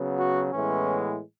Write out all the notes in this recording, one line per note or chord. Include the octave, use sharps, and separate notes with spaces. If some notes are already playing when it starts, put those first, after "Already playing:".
Already playing: C#3 F#3 B3
F#4
A2 E3 G#3 B3 C#4